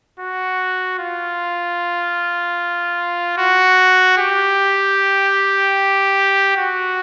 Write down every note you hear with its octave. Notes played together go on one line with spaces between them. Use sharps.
F#4
F4
F#4
G4
F#4